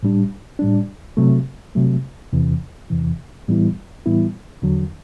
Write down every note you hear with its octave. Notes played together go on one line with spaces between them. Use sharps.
A2 G3 D4
A2 G3 D4
C3 F#3 A3
C3 F#3 A3
E2 C3 E3
E2 C3 E3
A2 E3 G3 B3 E4
A2 E3 G3 B3 E4
E2 D3 F#3